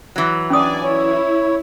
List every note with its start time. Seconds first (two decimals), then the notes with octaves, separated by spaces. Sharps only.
0.16 E3 F#3
0.50 C#4 D4 D5 G#5 D#6
0.83 E4 C#5